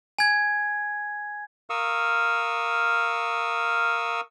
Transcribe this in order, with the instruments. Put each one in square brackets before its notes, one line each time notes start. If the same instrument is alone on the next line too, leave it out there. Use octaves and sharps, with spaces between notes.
[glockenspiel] G#5 G#6
[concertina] A#4 F5 C#6 D#6 E6